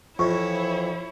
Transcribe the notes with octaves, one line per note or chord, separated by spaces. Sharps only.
F2 E3 F3 E4 C#5 C#6